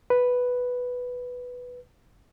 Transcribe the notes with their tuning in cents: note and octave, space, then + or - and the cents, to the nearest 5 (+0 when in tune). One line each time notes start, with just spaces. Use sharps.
B4 +0